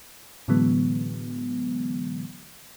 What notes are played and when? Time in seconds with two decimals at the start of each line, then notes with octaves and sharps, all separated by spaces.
0.48 A2 D3 E3 F#3 G#3 B3